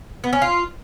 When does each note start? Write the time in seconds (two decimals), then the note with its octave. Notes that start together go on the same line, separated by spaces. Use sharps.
0.24 B3
0.33 C#4
0.42 F4